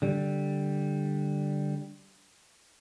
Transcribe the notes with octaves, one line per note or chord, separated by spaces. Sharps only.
D3 G3